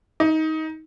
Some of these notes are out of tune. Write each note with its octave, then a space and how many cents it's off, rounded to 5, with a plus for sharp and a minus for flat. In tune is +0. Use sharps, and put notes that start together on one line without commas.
D#4 +20